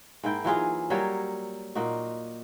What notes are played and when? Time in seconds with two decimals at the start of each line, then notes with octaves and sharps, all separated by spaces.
0.23 G#2 A#3 E4 G5
0.44 E3 F#3 F4 G#4
0.90 F#3 G3 A#3 C#5
1.75 A#2 A#3 D#4 F#4